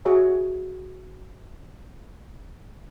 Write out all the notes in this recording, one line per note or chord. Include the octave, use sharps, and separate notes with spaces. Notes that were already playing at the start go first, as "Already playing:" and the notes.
F#4 G#4 C#5 E5 A#5